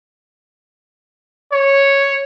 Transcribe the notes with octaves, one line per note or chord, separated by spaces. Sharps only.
C#5